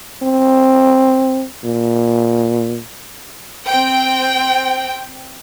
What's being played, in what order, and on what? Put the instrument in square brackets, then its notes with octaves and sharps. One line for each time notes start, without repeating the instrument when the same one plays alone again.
[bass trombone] C4
A#2
[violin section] C4 G5